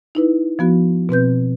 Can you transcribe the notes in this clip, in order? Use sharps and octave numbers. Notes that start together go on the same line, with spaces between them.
D#4 E4 B4
F3 B3 F#4
B2 C4 B4 G6